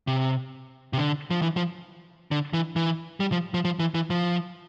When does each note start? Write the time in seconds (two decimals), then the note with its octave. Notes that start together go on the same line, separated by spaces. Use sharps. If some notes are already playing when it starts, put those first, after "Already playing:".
0.07 C3
0.93 C3
0.98 D3
1.30 F3
1.42 E3
1.57 F3
2.31 D3
2.53 E3
2.76 E3
3.20 G3
3.32 F3
3.54 F3
3.65 F3
3.80 E3
3.95 E3
4.10 F3